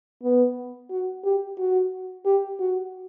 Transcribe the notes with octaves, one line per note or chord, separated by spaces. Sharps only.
B3
F#4
G4
F#4
G4
F#4